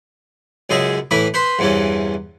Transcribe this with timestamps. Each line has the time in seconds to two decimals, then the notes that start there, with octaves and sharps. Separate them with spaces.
0.70 C#2 F#2 C#3 G#4 D#5 E5
1.11 A2 E3 E4 B5 D6
1.34 B4 C5 B5 C6
1.59 E2 G2 C3 E3 C#4